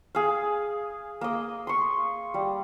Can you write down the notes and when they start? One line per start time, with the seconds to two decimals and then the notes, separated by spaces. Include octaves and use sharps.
0.15 G#4 F5
1.21 A#3 D#5
1.67 C6 C#6
2.34 G3